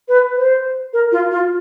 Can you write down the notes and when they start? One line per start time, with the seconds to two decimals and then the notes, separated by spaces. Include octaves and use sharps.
0.08 B4
0.36 C5
0.93 A#4
1.12 F4
1.31 F4